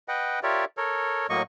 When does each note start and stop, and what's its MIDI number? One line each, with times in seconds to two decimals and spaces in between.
0.08 0.40 71
0.08 0.40 75
0.08 0.40 78
0.08 0.40 79
0.43 0.65 65
0.43 0.65 67
0.43 0.65 70
0.43 0.65 73
0.43 0.65 74
0.43 0.65 76
0.77 1.27 69
0.77 1.27 70
0.77 1.27 73
1.29 1.42 45
1.29 1.42 54
1.29 1.42 58
1.29 1.42 75
1.29 1.42 85